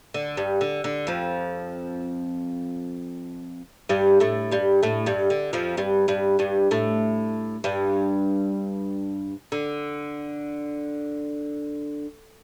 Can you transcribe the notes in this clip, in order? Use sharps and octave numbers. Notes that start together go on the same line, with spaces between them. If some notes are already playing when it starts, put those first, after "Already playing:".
D3
G2 G3
D3
D3
F2 F3
G2 G3
A2 A3
G2 G3
A2 A3
G2 G3
D3
F2 F3
G2 G3
G2 G3
G2 G3
A2 A3
G2 G3
D3